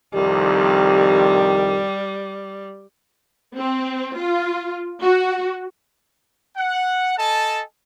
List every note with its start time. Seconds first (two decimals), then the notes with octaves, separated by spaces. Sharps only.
0.14 C2 F2 D#3 G3 G4
3.56 C4
4.16 F4
5.03 F#4
6.57 F#5
7.17 A4 D#5 G#5 A5